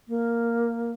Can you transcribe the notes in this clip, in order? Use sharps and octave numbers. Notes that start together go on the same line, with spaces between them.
A#3